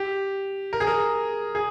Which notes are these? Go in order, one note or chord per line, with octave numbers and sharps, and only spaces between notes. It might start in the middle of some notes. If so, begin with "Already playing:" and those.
Already playing: G4
A#4
G#4
A#4
G#4